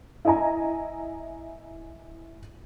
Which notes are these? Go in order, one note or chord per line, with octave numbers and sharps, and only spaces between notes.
E4 D#5 G#5 A#5